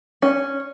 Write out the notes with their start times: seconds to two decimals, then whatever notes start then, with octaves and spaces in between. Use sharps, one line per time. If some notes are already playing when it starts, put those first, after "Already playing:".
0.22 C#4